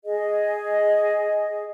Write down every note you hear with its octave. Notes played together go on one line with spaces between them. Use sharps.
G#4 D#5